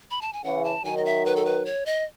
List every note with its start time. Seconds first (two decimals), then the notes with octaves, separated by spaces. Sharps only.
0.11 B5
0.21 A5
0.33 G#5
0.44 C#3 E3 F#5
0.64 A5
0.84 D#3 F#3 G#5
0.97 D#5
1.05 E5
1.26 B4
1.36 A4
1.45 B4
1.66 C#5
1.86 D#5